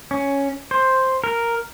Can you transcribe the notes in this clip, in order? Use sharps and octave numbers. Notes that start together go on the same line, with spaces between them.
C#4
C5
A#4